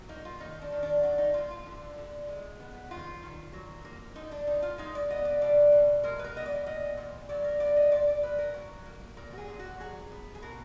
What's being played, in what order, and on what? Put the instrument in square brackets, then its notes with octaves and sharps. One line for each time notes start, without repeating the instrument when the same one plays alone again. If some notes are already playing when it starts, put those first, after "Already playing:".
Already playing: [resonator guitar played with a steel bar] F#3
A#3 D#4
F4
D#3 D#4
D4
D#3
D4
F#3 D4
D#4
A#3 F4
F4
D3
D3
G#3
B3
D#3 F4
D#3
F#3
A#3
D3 D#4
D4
D3 D#4
F4
G#3 D#4
D5
B3 D#5
D5
B2 D5
B2
G#3 A#4
B4
A#4
B3 D#5
D5
A#2 D#5
A#2
F#3 D5
A#4
B3 D5
D#5
A#2 D5
D5
A#2 B4
A#4
F#3
A#3
A#2 A#4
F#4
G#4
A#2
F#4
F#3 G#4
B3
G#4
B2 A#4